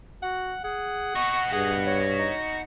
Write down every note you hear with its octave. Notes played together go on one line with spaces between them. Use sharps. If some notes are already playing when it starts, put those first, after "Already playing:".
F#4 F#5
G#4 F#5
F#4 D#5 C#6
G2 G#4 F#5
C#5
D#4